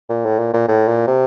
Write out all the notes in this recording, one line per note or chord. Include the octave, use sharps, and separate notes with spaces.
A#2
A2
A#2
A#2
A2
A#2
C3